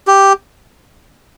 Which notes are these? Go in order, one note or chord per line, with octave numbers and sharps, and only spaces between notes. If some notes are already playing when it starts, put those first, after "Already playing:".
G4